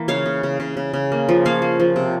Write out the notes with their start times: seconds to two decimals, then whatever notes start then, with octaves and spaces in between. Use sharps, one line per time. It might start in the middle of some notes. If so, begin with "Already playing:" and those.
Already playing: E3 A#3
0.08 C#3 C#5 F5
0.26 C#3
0.43 C#3
0.60 C#3
0.77 C#3
0.93 C#3
1.12 A#3
1.29 F3
1.45 A#3 C#5 F5
1.62 A#3
1.80 F3
1.96 C3